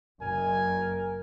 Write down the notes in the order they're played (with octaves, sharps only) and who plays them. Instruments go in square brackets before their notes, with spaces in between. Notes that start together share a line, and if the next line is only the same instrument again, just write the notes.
[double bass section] F#1 [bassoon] A#4 [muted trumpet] G#5